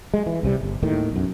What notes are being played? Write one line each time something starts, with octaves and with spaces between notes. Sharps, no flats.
G#3
E3
C2 C3 G3
G1
D#2 A2 D#3
B1 F#2